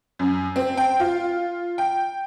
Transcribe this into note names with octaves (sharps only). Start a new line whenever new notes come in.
F#2
C4
G5
F4
G5